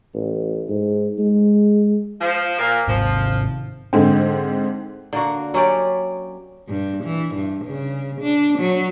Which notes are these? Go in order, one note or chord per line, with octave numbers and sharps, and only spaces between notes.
A1
G#2
G#3
F3
A#2 A#3
G#1 C3 F3
G#2 D3 C4
D3 A#3 F#4
F#3 C#4 G4 D5
G2
E3
G2
C#3
D4
F#3